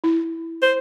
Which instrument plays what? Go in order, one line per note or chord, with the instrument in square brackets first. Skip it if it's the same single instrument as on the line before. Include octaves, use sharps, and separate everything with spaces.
[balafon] E4
[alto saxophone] C5